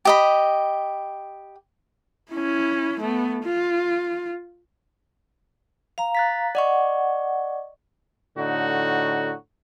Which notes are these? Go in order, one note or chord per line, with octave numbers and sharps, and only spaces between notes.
G4 D#5 B5
C#4 E4
A3 B3
F4
F5 A#5
F#6 A6 B6
D5 D#5 F#5 C#6
A2 D3 D#4 F#4